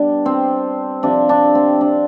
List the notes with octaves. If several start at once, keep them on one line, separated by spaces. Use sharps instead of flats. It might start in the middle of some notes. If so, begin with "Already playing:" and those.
Already playing: B2 G3 D4
C4
C3 F3 D4
D4
C4
D4